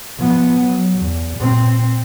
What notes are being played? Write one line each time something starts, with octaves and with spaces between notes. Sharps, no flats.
F3 B3
F#3
E2
A#2 C4